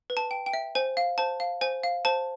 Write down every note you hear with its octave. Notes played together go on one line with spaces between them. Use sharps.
B4
A5
G5
G5
E5
C5 G#5
F5
C5 A5
F5
C5 G#5
F5
C5 A5